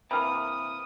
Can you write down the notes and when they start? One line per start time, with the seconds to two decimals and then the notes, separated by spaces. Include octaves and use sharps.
0.11 C3 E3 A#3 B5 D#6 F6